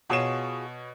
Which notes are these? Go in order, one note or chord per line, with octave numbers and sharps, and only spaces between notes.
B2 F4 F#4 G#4 C#5 E7